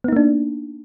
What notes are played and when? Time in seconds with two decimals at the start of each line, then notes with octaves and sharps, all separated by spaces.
0.04 B3
0.08 D#4
0.12 A#3
0.16 D4